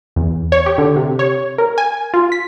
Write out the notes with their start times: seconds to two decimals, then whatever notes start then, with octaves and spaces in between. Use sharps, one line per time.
0.16 E2
0.52 C#5
0.66 G4
0.78 D3
0.96 C3
1.19 C#5
1.58 A#4
1.78 G#5
2.14 F4
2.32 B6